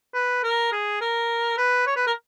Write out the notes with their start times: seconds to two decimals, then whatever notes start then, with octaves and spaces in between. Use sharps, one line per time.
0.14 B4
0.44 A#4
0.72 G#4
1.01 A#4
1.58 B4
1.87 C#5
1.96 B4
2.07 A#4